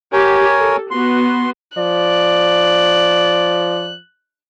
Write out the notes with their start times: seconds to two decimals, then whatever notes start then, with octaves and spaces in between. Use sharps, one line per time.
0.13 G4 A#4 C#5 G#5
0.58 A4
0.91 B3 F#4 C6
1.78 F3 D5 F#6